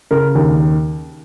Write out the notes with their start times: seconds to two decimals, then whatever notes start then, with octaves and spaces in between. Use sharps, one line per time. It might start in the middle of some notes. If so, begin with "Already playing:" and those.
0.11 C#3 A#4
0.35 D#2